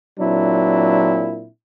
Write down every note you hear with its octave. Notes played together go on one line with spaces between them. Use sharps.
A#2 F#3 C4 D4 E4